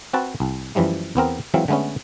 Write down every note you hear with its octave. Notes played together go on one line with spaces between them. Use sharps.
C4 F#4 B4 A5
C2
F#2 E3 F3 G3 A3
E2 B3 C4 A#4
E3 F#3 G#3 C4 F4
D3 G#3 A3 B3 C#4